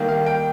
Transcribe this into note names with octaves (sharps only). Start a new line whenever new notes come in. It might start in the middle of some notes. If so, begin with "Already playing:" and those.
Already playing: D#3 G3 A#3
F5
G5